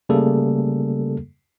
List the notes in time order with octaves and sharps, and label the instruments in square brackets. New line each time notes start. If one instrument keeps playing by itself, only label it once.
[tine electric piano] C#3 G3 A3 A#3 G#4 A4